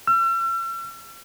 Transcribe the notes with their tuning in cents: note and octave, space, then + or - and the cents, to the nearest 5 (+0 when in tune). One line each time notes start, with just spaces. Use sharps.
E6 +45